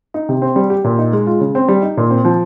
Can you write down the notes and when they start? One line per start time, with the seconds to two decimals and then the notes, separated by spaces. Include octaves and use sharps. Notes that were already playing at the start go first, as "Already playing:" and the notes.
0.14 D#4
0.29 C3
0.42 C4
0.56 G3
0.70 G4
0.84 A#2
0.98 D#4
1.13 G#3
1.27 F4
1.41 C#3
1.55 C4
1.68 G3
1.82 D#4
1.97 A#2
2.10 C4
2.25 F3